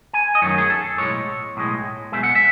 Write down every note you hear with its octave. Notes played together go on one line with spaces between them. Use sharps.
G#5
D#5
F#2 D#3 F#3 A3 C#5
G#4
A4
B1 A2 G#3 C#5
B1 A2 G#3
B1 B2 G#3 E5
F#5
E5